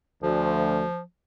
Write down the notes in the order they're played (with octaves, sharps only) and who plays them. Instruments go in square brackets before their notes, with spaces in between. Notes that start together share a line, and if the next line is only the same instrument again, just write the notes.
[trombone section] D2 [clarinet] F3